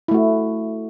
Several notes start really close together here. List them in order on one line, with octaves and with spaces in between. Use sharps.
E4 A3 F#4